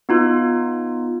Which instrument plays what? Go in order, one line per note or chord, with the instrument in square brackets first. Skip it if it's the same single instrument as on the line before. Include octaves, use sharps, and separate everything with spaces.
[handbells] B3 D#4 F4